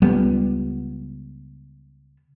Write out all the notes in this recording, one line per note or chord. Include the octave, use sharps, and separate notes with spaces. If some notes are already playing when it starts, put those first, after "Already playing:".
C#2 G3 B3